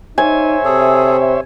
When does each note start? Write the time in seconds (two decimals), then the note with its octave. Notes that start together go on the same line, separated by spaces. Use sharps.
0.18 D#4 C5 C#5 E5 G#5
0.65 C3 G#4 A4